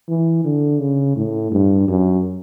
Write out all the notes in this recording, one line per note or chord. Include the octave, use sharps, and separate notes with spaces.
E3
D3
C#3
A2
G2
F#2